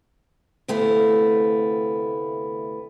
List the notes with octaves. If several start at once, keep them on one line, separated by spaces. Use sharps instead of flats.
D2 C3 A3 B3 E4 F5